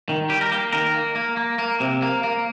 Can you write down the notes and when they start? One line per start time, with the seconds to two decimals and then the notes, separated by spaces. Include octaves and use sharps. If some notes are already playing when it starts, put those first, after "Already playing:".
0.09 D#3
0.29 G3 G4
0.41 A#4
0.51 A#3 G4
0.73 D#3 A#4
0.94 A#3
1.15 A#3
1.37 A#3
1.59 A#3
1.80 C3
2.02 A#3
2.24 A#3